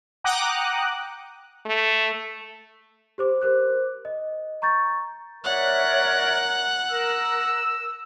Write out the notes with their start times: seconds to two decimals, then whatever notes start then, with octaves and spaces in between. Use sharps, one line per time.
0.24 F#5 G5 A#5 D6 D#6 F#6
1.66 A3
3.18 G4 C5 D6
3.42 A#4 C5 D6 F#6
4.05 D#5
4.62 A#5 C#6 G6 A6
5.44 A#4 C#5 D5 E5 F#5
6.90 A#4 E6